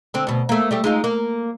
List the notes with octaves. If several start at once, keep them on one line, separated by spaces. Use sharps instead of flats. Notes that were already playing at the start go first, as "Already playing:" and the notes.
D3 C4
D2 B2
A3 A#3
G3 A3 G4
G#3 D#4 F4
A#3